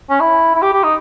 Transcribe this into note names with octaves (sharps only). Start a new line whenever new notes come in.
C#4
E4
E4
G4
G4
D#4